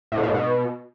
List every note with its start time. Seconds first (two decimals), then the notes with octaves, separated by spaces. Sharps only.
0.12 A2
0.18 B2
0.23 A#2
0.29 G#2
0.35 B2